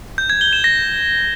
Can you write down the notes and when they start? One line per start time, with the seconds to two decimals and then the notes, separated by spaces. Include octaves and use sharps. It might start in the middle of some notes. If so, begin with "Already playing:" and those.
0.18 G6
0.30 G#6
0.41 G7
0.53 E7
0.64 A#6